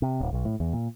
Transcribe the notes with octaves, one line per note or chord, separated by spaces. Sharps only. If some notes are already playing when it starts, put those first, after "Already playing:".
C3
D1
B1
A2
E2
A#2